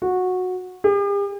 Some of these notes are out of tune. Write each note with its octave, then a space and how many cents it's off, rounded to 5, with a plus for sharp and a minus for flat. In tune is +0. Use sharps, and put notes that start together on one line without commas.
F#4 -15
G4 +45